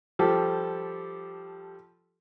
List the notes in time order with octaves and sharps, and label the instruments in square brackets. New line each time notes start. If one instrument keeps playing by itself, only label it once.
[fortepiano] F3 G3 G4 A4